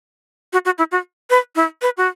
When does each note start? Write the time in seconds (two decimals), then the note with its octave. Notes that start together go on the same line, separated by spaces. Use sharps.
0.53 F#4
0.65 F#4
0.78 E4
0.92 F#4
1.30 B4
1.56 E4
1.82 B4
1.97 F#4